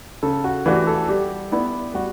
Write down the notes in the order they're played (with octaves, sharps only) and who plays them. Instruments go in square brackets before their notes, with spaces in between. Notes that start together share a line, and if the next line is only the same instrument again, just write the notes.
[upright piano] C#3 [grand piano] A4
[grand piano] F#4
[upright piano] E3 A3 D4 F#4 [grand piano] G4
[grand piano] A4
[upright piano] G3 [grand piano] G4
[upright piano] B3 E4 B4 D5
[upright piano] G3 [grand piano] F#4